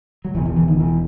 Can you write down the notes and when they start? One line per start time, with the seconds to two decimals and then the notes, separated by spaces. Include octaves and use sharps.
0.25 F#3
0.35 E1 E2 B2 E3
0.45 E3
0.56 E3
0.68 D#3
0.79 E3